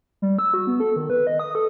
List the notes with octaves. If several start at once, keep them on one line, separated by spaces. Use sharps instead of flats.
G3
E6
F#4
B3
A4
D#3
B4
D#5
D#6
A4